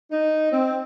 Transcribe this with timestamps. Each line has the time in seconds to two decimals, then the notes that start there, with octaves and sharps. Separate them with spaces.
0.12 D#4
0.51 C4